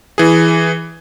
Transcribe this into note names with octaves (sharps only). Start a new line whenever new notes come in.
E3 G#4